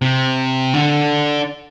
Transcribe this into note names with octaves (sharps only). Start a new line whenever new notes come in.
C3
D3